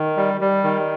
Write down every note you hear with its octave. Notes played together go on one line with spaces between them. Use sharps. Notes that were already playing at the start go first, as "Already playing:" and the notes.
Already playing: D#3
G3
G3
D#3